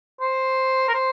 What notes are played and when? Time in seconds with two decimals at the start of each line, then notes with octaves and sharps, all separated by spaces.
0.21 C5
0.88 A#4
0.94 C5